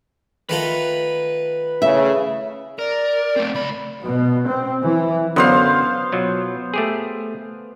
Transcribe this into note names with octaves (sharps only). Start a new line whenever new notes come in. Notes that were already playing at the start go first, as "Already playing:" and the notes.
D#3 A3 F4 B4
A2 C#3 E5
A#4 D5
A3 C4
C#2 D5 B5
B2
C4
E3
F#2 D3 F#3 B3 C5 F5
B2 F#3 F4
A3 G4 G#4